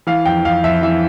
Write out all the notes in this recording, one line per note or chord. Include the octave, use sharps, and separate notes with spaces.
E3 F5
F2 G5
F2 F5
F2 E5
E3 E5